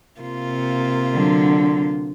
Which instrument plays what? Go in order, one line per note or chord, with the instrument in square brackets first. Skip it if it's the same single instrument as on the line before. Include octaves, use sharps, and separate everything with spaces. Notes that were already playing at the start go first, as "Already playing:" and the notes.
[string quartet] C3 A#3 F4
[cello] D3 F#3